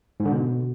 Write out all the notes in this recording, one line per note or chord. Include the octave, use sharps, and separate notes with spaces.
G#2
D3
B2